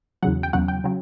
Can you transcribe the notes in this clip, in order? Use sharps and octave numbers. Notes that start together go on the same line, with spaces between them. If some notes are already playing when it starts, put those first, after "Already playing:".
E2 C#3 F#3 F#5
G5
E2 C#3 F#3 F#5
G5
C#3 F#3